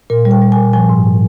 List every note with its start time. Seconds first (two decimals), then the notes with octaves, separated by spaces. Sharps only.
0.10 A#2 A#4
0.25 G3
0.31 G5
0.42 G3
0.52 G#5
0.57 A#2
0.73 F3 G#5
0.89 G#2